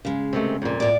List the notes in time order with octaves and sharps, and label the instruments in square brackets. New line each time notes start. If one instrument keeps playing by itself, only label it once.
[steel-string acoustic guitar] C#3 G#3
[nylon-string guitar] C3 D#3 A3
F2 A#2
[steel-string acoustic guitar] A2 D5